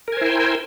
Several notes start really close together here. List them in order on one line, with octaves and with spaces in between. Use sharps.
A#4 G#5 C5 E4 G5